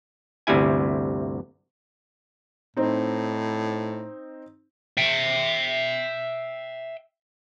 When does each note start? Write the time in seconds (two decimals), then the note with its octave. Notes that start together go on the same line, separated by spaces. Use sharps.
0.47 G1 D2 C3 G3 E4 G#5
2.77 A2 C4 D#4
4.97 E5 G5